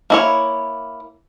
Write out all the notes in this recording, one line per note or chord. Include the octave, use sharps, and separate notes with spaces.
A#3 E4 C#5